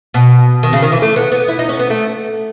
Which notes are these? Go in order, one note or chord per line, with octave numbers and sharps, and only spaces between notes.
B2
D#3
C#3
D#3
E3
A3
B3
B3
E4
D#4
C#4
B3
A3